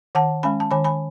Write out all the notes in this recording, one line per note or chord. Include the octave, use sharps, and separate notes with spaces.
D#3 F#5 A5
G#3 C#4 G#5 B5
A5
D#3 G#5 B5
G#5 B5